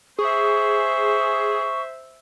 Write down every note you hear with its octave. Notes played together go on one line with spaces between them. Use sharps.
G#4 C5 E5 C#6